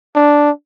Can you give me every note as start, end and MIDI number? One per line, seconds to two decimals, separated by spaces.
0.15 0.50 62